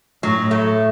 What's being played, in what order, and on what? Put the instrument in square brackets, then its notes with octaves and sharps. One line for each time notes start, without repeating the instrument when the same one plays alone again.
[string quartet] A2 [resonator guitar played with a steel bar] F#3
[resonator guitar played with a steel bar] A3